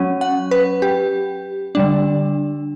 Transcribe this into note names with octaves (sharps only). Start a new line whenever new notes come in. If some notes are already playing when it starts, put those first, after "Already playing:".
Already playing: F#3 C#4
F#5
B4
G4
D3 G3 D4